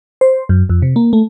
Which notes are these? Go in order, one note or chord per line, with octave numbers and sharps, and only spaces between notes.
C5
F#2
F2
C3
A#3
A3